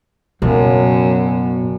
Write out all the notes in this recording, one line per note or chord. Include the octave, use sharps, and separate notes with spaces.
F#1 F#2 B2